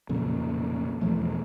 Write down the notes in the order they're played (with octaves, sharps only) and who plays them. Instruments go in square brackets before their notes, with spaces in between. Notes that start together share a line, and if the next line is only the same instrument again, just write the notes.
[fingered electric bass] B1 F2 A#2 C#3
E2 B2 F3 A3